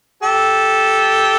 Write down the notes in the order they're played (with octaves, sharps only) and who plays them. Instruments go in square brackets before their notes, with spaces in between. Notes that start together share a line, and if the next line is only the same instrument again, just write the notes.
[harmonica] G4 A4